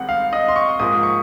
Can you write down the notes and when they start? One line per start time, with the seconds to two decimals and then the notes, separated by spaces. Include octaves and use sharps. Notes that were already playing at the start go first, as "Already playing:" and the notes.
Already playing: C2 D#3 G#3 C4 F#5
0.09 F5
0.33 D#5
0.48 C6
0.56 C#6
0.80 G#2 F3 A#3 D#6
1.03 C#6